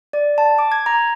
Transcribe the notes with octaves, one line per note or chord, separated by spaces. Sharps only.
D5
A5
D6
G#6
A#5